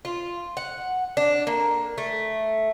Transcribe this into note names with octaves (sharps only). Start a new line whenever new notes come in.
F4
F#5
D4
A#3
A3